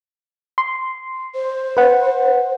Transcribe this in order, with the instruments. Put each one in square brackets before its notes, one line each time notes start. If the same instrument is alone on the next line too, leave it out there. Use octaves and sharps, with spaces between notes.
[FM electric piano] C6
[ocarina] C5
[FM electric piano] B4 F#5